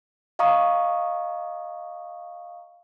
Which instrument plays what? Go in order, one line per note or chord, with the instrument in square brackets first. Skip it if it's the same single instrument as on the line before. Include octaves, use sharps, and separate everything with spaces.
[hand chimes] D#5 F5 A#5 C#6 D#6